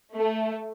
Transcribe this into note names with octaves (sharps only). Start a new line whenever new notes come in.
A3